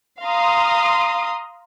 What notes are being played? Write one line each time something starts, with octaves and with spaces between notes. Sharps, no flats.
F5 A#5 C6 D#6